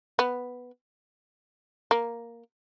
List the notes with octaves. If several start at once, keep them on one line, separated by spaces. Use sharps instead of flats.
B3
A#3